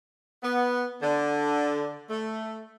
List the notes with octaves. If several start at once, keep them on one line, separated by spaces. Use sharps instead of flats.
B3
D3
A3